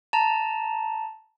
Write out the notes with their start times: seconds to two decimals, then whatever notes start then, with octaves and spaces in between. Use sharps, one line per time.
0.13 A5 A#5